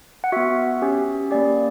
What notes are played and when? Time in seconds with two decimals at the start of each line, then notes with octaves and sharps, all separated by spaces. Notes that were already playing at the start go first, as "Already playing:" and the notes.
0.24 F#5
0.32 B3 F#4 E5
0.82 C#4 G4
1.31 A#3 C#4 G4 D5